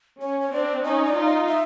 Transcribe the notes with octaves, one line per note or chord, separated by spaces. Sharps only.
C#4 C#5
C#5
C4 D4 D5
C#4 D#4 D#5
D5
D#4 F4
D#5
E5